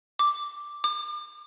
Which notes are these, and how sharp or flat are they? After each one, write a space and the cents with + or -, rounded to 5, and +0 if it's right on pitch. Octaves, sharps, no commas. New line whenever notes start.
D6 +0
D6 +40